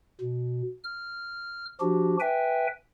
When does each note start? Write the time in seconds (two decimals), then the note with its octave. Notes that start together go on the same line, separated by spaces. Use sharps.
0.21 B2
0.84 F6
1.81 F3 D4 F#4 G4
2.20 B4 E5 G5 G#5